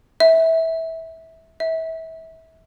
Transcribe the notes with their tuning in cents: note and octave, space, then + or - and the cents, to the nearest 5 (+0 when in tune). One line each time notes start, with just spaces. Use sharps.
E5 -20
E5 -30